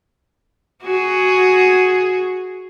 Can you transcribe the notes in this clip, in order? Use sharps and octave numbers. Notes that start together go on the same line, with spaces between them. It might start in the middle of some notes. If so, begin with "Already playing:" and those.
F#4 G#4